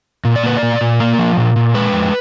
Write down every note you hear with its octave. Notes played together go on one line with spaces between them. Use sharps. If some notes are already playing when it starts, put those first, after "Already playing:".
A#2
D5
A#3 B4
D5
A#2
A#2
A#3
F3
A#2
A#2
G#3 B4
F2